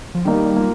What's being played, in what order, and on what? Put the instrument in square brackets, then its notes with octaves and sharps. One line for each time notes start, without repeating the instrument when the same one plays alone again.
[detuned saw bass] F3
[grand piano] D#3 A#3 D#4 [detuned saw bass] G3
[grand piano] A#3 F4